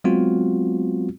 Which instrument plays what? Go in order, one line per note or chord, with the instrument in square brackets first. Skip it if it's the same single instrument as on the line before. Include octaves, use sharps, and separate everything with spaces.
[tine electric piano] F#3 G#3 B3 C4 F4 F#4